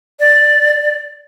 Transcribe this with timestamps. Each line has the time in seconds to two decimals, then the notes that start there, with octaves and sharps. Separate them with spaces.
0.20 D5